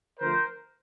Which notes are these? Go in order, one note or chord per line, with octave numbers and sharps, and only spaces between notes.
D3 F3 A3 A#4 C5